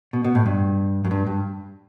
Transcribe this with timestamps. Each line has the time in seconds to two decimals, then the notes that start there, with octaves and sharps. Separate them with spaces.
0.13 B2
0.25 B2
0.35 A2
0.46 G2
1.05 F#2
1.11 G2
1.27 G2